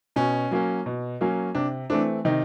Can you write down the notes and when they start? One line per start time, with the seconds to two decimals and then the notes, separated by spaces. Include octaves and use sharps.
0.16 B2 C#4
0.51 F#3 A#3 C#4
0.86 B2
1.21 F#3 A#3 C#4
1.55 C3 D4
1.90 E3 A3 C4 D4
2.25 C3 D#3 D#4